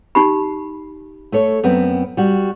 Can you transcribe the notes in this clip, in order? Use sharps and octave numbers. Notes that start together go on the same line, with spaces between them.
D#4 G4 B5
A3 A4 C#5
F#2 B3 C4
G3 F#4